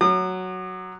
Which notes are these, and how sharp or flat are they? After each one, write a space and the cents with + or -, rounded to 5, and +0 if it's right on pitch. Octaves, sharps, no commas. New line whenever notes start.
F#3 +0 D#6 -45